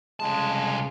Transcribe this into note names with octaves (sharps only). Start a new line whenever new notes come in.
C2 F2 C#3 G#3 A5